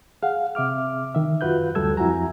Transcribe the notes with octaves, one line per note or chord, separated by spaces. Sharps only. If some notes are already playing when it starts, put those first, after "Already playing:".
G#4 F5 F#5
C3 E5 D6 F6
D#3 E5
F#2 F4 F#4 B4 F#6 G6
D2 F#3 G3 A4 E6 G#6
F2 E4 F#4 G#5 A#5